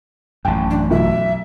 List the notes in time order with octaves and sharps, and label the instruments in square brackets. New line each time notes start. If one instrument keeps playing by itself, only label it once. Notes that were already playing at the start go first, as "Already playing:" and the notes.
[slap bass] A1 F#2 [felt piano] G5 A5
[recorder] D4
[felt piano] B1 [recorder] E5